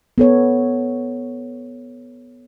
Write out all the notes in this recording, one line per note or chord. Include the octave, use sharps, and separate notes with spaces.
B3 A4 C#5